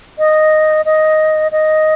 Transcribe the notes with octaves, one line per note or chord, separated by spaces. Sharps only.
D#5
D#5
D#5